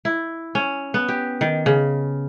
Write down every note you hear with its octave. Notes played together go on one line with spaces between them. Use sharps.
E4
C#4
B3
G4
D#3
C#3